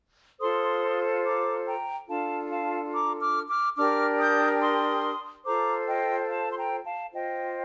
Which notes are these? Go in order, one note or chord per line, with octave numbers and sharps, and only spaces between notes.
F4 A4 C5 C6 D#6
A#5 D6
G5 A#5
D4 F4 A4 F5 A5
F5 A5
A#5 D6
D6 F6
D6 F6
D4 G4 A#4 D6 F6
D#6 G6
C6 D#6
F4 A4 C5 A#5 D6
D#5 G5
F5 A5
C6
G5 A#5
F5 A5
F4 C5 D#5 G5